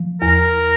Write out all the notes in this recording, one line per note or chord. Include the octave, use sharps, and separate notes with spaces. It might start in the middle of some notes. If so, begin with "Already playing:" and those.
Already playing: F3
E2 A#4